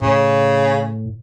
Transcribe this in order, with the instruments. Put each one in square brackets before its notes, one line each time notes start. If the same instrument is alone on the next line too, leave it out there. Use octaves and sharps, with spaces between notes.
[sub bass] A2 [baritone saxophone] C#3